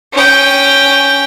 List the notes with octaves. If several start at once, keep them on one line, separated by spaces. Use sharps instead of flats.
C#4 G5